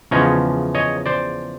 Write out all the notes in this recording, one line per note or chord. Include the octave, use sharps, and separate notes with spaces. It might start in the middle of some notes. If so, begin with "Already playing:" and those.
E2 C#3 F3 G#3 C#5 D#5
C#5 D#5
C5 D5